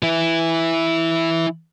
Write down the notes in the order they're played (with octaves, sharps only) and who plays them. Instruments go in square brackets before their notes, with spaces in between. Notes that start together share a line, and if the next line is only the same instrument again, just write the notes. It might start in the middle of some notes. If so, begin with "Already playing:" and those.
[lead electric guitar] E3 E4